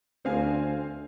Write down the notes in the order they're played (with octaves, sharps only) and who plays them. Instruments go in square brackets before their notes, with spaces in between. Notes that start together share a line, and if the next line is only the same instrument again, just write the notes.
[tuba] D2 [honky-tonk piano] C4 F5 G#5